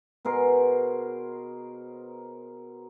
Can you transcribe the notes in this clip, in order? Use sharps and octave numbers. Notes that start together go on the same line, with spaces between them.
B2 G#4 A#4 C5